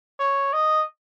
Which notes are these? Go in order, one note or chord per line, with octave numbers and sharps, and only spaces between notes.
C#5
D#5